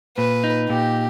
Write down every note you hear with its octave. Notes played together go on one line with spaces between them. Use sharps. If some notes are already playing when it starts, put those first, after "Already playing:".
A#2 B4
D#4
A#2 G4